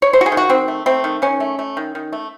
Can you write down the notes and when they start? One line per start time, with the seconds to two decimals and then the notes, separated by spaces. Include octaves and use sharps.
0.02 C#5
0.13 A3 C5
0.21 F#4
0.26 G#4
0.32 D#3
0.37 F#4
0.50 D#3 C4
0.68 A3
0.86 A3 C4
1.04 D#3
1.22 D#3 C#4
1.40 A3
1.59 A3
1.77 D#3
1.95 D#3
2.13 A3